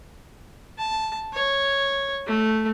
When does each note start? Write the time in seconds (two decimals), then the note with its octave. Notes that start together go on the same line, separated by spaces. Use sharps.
0.78 A5
1.33 C#5
2.27 A3